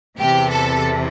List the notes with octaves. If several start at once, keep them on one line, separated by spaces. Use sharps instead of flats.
E2 C3 E3 G4
A4